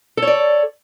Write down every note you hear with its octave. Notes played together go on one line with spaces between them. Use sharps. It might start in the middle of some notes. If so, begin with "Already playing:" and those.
A4 C#5 D5